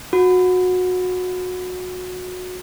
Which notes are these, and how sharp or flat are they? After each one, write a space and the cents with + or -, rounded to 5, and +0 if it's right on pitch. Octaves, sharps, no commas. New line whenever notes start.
F#4 -20